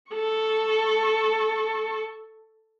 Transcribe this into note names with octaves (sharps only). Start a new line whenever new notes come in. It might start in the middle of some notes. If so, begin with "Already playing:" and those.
A4 C#6